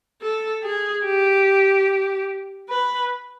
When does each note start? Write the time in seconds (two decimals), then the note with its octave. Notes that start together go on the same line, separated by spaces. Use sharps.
0.22 A4
0.63 G#4
1.04 G4
2.70 B4